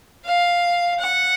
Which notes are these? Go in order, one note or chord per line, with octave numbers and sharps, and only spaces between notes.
F5
F#5